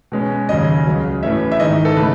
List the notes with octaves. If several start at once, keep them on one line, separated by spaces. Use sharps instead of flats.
B2 G#3 C#4
D#2 C#3 F#3 C#4 D#5
C#2 C#3 F#3
A2 E3 A3 C#4 E5
E5
G#2 D#3 G#3 D#4 D#5
A4
C#3 E3 A3 B4